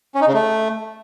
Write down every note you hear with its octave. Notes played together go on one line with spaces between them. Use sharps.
C#4
D#4
C#3
A3